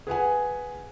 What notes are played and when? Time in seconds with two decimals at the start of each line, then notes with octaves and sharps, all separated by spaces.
0.07 G#4 B4 F#5 G#5